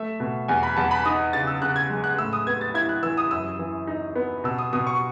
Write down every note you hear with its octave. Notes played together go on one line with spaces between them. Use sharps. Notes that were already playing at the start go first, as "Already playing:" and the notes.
Already playing: A3 E5
B2
E2 G#5
B5
E2 A5
B5
D#4 D#6
C#3 A6
E6
C#3 F#6
G#6
G#3
F#6
A2 E6
D#6
B3 G#6
A6
E4 G#6
F#6
E3 E6
D#6
F#2 E6
E3
D#4
B3
B2 E6
D#6
B2 D#6
C#6